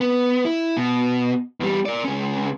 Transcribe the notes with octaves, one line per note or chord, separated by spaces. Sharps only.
B3
E4
B2
E2 G3
A#4 D5
C#2 C#4